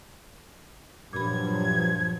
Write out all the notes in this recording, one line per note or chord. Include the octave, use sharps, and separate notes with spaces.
G2 A#2 F3 F#3 B5 G#6